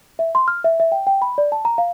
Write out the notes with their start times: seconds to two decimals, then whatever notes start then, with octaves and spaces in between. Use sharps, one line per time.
0.19 E5
0.35 C6
0.48 F6
0.64 E5
0.80 E5
0.92 G5
1.07 G5
1.22 B5
1.38 D5
1.52 A5
1.65 A#5
1.78 F5